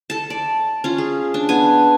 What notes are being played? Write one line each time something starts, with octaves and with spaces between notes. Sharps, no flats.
A4 A5
D5
C#4 F4
G#4
D4
B3 G#5